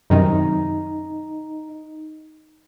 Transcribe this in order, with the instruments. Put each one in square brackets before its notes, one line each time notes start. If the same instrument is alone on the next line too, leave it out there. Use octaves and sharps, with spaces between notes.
[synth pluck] F#2 C3 D#3 [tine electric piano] D#4